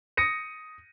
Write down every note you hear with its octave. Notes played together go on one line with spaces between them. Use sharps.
D#6 A#6 C#7 D#7